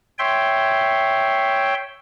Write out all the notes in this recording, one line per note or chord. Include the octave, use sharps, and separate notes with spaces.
C#5 E5 G5 C6